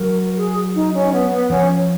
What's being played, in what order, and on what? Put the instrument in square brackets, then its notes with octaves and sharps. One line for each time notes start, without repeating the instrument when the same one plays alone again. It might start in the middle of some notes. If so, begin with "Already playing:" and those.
Already playing: [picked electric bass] F#3 [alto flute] A#4
[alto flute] G#4
D#4
C#4
B3
B3
[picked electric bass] F3 [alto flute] C#4